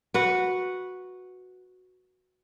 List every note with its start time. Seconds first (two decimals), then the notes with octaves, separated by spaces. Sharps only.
0.14 F#4 B4 F#5